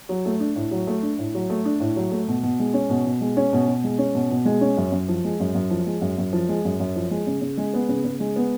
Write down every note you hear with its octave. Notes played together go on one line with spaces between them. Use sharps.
F#3
A3
D4
A2
F#3
A3
D4
A2
F#3
A3
D4
A2
F#3
A3
B2
B2
G#3
C#4
B2
B2
G#3
C#4
B2
B2
G#3
C#4
B2
B2
G#3
C#4
F#2
F#2
F3
G#3
F#2
F#2
F3
G#3
F#2
F#2
F3
G#3
F#2
F#2
F3
G#3
C#3
C#3
G#3
B3
C#3
C#3
G#3
B3